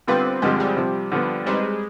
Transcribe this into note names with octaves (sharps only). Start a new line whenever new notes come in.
D3 G3 B3 C4 F4 B4
G2 D3 F3 G#3 C4 G4
G3
C3 F3 C4
D3 F3 B3
G3 G#3 C4 D#4 B4